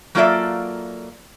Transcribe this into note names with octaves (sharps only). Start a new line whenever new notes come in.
F#3 A#3 F4 A4 D5 E5